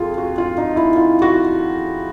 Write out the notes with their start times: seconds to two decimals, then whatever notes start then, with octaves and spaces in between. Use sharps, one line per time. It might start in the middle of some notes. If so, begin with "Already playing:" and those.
Already playing: F2 F4 G#4
0.18 F#4
0.38 F4
0.58 D#4
0.76 E4
0.96 F4
1.22 F#4